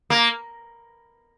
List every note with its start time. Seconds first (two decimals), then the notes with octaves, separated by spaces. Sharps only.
0.10 A#3